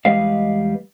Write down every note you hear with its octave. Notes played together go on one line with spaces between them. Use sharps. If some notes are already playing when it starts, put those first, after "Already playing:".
E2 G3 G#3 B4 D#5 F5